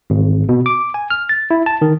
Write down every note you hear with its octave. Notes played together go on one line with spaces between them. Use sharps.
G#1
B2
D6
G#5
F6
A6
E4
A5
D#3